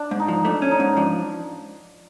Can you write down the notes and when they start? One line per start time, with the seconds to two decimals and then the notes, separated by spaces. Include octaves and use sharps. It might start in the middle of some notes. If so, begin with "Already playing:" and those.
Already playing: D4
0.11 G#2
0.20 D#4
0.28 F3
0.45 A3 D4
0.62 C#4
0.71 D#4
0.80 G#2
0.97 F3 D4